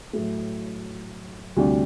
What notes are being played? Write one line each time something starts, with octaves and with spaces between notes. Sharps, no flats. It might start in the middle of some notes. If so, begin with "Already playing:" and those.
A2 F#3 A3
D2 C3 G3 D4